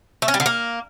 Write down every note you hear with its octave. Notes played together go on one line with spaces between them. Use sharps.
A3
C#4
G3
D3
A#3